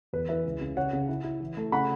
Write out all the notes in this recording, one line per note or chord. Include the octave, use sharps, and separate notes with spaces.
E2 B4
E3 B4 E5
C#2
C#3
C#3 C#5 F#5
C#3
E4
E4
E3
A3
C#3 F#5 B5